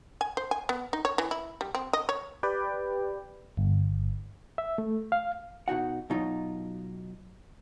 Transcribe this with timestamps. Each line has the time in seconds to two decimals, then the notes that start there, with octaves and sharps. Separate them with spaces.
0.21 G#5
0.37 C5
0.51 G#5
0.69 B3
0.93 D#4
1.05 C#5
1.18 E3
1.31 E4
1.61 G3
1.75 C4
1.93 D#5
2.09 C#5
2.43 G4 B4 D5 G5
3.57 G1
4.58 E5
4.78 A3
5.12 F5
5.68 B2 D#4 F#4 F#5
6.10 B2 F#3 D#4 F4